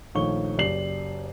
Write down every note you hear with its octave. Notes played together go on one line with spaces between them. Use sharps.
A#1 D#3 A3 C#5 C#6 G7
F#1 G4 D5 C7 F#7